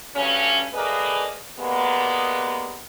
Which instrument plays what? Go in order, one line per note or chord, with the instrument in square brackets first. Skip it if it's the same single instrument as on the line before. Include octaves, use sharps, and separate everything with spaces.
[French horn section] G2 F#3 A3 C#4
A2 A#3 G#4 B4 D5 D#5
G3 G#3 A#3 B3